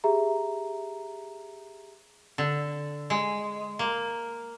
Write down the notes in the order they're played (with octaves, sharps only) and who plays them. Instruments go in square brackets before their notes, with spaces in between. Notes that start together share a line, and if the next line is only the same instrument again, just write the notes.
[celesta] G4 G#4 E5 A#5
[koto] D3
G#3
A#3